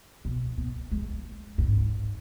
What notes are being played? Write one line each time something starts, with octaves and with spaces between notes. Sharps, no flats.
B2
B3
G#3
G#2